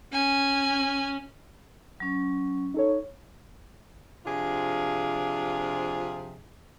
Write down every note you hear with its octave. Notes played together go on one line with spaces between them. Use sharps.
C#4 G#5
F#3 C#4
D#4 A4 C#5
C3 F3 D4 F4 G#4